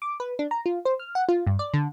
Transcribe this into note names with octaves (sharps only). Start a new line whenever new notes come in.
D6
B4
D4
A#5
F4
C5
F6
F#5
F4
G2
D5
D3